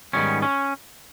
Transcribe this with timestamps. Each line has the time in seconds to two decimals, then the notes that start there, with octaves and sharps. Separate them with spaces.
0.13 G#2 D#3 G3 B3 C#4
0.42 C#4